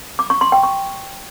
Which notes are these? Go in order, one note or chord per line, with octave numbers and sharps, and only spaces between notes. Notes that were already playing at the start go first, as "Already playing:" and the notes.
D6
C#6
C6
G5
C#6